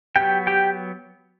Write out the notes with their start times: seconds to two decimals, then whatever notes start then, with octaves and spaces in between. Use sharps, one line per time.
0.16 F#3 B3 G4 G5
0.47 G4 G5